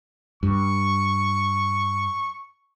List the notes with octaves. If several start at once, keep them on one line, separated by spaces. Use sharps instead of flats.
G2 C#6